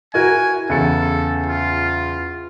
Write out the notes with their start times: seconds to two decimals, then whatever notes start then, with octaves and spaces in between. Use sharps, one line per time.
0.14 E4 F#4 A#4 G#5
0.70 E2 C#3 A4 C#7
1.46 F4